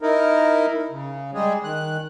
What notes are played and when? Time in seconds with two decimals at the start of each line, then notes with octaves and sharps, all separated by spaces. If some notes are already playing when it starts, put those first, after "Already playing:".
0.02 D#4 E4 A#4
0.91 C#3
1.34 G3 G#3 G#4
1.64 D#3 F#6